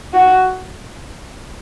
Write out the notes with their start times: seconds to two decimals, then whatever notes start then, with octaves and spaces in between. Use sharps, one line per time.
0.13 F#4